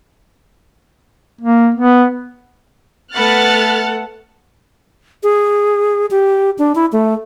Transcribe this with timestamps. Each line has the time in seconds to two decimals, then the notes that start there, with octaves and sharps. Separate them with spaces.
1.41 A#3
1.75 B3
3.14 A3 B3 A4 B4 F#5 F6 F#6 A6
5.23 G#4
6.11 G4
6.58 D4
6.75 E4
6.92 A3